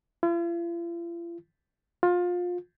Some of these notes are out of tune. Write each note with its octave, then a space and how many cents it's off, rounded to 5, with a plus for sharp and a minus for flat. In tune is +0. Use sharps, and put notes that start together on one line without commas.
F4 -45
F4 +25